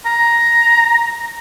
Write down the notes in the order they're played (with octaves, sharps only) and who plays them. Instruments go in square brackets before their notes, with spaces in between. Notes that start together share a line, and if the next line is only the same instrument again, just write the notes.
[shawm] A#5